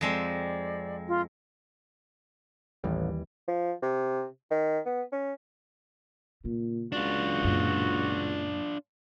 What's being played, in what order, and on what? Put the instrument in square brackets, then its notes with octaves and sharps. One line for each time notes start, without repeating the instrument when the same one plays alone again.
[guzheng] F2 G#3 C4 [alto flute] D5
[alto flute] F4
[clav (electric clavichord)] A1 [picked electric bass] D#2 E3 G3
[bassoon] F3
C3
D#3
B3
C#4
[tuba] A#2 [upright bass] C#3
[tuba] C#2 [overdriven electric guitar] D4 F4 [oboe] F#4
[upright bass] F#2 A#2